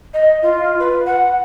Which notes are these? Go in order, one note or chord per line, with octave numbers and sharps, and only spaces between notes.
D#5
F4
B4
F#5